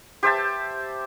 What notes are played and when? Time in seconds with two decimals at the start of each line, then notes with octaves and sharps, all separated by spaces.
0.23 G4 C5 E5 A5